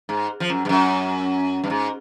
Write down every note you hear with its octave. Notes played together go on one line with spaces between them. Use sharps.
G#2
F3
F#2
G2
F#2
G2
G#2